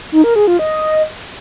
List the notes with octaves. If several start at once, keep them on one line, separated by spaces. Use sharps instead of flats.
D#4
A#4
G#4
F4
D#5